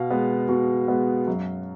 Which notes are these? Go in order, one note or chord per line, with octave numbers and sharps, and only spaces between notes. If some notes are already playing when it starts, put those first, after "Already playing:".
Already playing: B2 F5
G#3 B3
B2
G#3 B3
F#2